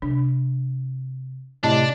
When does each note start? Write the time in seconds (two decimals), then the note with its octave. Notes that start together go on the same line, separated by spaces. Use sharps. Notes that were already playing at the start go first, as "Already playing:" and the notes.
0.02 C3 D4
1.64 A2 C3 D4 D#5 A5